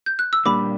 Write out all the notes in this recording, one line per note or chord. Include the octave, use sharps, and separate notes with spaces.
G6
F#6
E6
A#2 G3 A#3 D4 G4 B5 D6